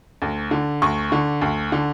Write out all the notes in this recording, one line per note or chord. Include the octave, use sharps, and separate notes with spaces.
D2
D3
D2 C#6
D3
D2
D3